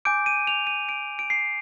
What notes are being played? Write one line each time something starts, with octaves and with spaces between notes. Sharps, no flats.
G#5 D6 G6 D7
D#7
F7
D#7
D7
D7
C7